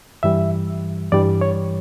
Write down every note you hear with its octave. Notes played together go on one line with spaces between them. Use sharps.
G2 E3 G3 E5
G2 E3 G3 D5
C#5